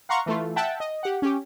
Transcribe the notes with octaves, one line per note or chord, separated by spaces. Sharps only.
F5 F#5 A#5 C6 C#6
E3 A3 F4
E5 F#5 G5 A5
D#5
G4 F#5
C#4 G4